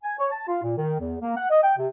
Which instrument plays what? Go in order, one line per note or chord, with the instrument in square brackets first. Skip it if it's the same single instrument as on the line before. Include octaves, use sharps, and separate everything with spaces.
[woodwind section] G#5
C#5
A5
F4
A#2
D#3
E2
A#3
F#5
D#5
G5
C3